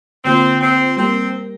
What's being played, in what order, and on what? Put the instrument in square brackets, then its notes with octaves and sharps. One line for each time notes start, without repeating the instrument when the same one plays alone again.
[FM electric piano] D3 A#3 F4 C5 [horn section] C4
[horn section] C4
[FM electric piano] G3 A#3 G4 A#4 [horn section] C4